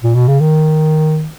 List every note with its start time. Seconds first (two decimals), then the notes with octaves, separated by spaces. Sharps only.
0.03 A#2
0.14 B2
0.28 C#3
0.40 D#3